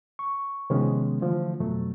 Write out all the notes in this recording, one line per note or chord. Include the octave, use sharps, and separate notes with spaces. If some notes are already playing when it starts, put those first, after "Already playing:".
C#6
C3 D#3 F3 G#3 B3 C#4
D3 E3 F3 A3
F2 B2 F#3 A3